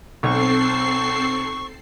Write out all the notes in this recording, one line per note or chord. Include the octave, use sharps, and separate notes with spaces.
B1 C4 A4 C#6 C7